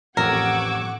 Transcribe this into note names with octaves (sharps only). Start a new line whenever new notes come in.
A1 F2 A#4 F#5 C#6 D6 E6 G#6